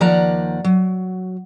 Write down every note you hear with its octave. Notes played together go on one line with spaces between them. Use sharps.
D#2 F3 D5 F#5 A#5
F#3